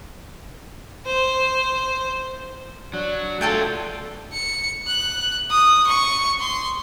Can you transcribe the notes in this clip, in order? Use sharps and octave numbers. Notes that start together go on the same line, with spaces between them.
C5
F#3 D4
A3 F4 A4 G5 G#5
C#7
F#6
D#6
C#6
C6